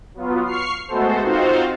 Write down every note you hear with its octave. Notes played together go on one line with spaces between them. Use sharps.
F#3 B3 F4
C#6 F6 C7
G#3 A3 B3 F#4 A4 C5
C4 D#4 F4 F#4 C5 F5